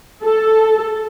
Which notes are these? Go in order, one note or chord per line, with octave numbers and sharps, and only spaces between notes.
A4